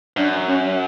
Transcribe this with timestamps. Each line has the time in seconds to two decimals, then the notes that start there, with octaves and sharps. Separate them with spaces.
0.17 F#2 D4
0.49 C#4